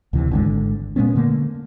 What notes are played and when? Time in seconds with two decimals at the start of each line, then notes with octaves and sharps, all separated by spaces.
0.13 D2 C3 E3
0.31 G#1 D3 G#3
0.96 A#2 G#3 B3 C#4
1.15 D3 A3 A#3